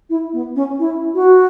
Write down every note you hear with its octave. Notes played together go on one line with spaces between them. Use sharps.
E4
B3
C#4
E4
F#4